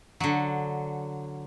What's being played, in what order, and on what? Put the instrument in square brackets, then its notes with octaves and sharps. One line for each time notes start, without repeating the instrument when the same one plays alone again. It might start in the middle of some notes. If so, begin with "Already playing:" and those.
[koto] D3 F#3